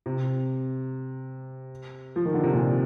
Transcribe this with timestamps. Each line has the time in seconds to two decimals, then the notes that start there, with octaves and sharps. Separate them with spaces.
0.06 C3
2.16 F3
2.25 D#3
2.34 D3
2.44 C3
2.53 A#2